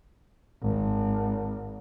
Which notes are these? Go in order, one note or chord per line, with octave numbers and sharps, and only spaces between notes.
G#1